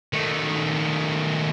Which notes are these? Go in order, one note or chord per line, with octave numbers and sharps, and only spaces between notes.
D#3 A3